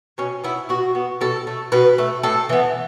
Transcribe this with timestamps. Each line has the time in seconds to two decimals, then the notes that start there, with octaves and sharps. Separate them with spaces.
0.18 B2 C#4
0.44 B3 E4
0.69 B2 F#4
0.95 B3
1.21 B2 A4
1.47 A3
1.72 B2 B4
1.98 A3
2.23 A2 A4
2.49 E3 B3